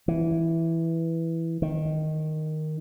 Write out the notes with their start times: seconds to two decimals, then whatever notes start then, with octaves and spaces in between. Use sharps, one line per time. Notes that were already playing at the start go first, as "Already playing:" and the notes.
0.08 E3
1.62 D#3